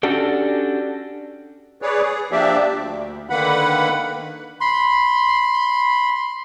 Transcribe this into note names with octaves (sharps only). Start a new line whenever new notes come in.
C#4 D4 F#4 G4 A4
G#4 B4 C#5 D5
G#4
F3 A#3 D4 G4 D5 E5
D2
D3 D#3 A#3 B4 F#5 B5
B5 C6